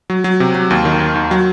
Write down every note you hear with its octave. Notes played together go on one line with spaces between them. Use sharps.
F#3
F#3
C3
F#3
D#2
D#3
D#2
D#2
F#3